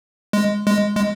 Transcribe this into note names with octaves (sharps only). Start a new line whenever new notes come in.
G#3
G#3
G#3